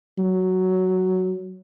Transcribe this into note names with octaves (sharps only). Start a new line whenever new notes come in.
F#3